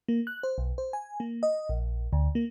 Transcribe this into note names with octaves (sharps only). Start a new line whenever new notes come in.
A#3
F#6
C5
B1
C5
G#5
A#3
D#5
A#1
D2
A#3